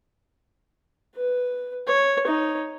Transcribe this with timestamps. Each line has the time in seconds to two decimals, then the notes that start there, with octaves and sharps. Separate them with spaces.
1.16 B4
1.87 C#5
2.27 D#4 C#5